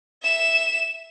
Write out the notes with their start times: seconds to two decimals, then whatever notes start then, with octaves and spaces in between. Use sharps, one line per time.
0.23 E5 E7